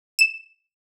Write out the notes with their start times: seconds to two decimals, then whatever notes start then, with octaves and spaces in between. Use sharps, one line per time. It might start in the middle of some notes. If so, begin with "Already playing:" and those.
0.19 E7